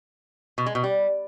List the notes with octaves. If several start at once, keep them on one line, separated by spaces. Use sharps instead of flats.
B2
G#3
B2
G3